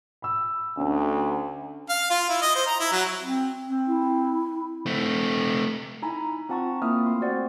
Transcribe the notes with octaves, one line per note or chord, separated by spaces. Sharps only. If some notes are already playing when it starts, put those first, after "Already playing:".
B5 E6
D2 C#4 D4
F5
F4
E4
D#5
C5
A#5
E4
F#3
C4
C4
E4
A3 C4
D#4 E4 G#5 A#5 B5
C4 F4 F#5 A5 A#5 C#6
A#3 C4 E4 E5 D#6 F6
A3 C6
C4 F#4 C5 D5 F#5